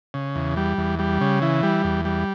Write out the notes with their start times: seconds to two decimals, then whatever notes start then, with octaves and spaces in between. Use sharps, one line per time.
0.14 C#3
0.36 E2
0.57 G3
0.78 E2
0.99 G3
1.21 C#3
1.42 E3
1.63 G3
1.84 E2
2.05 G3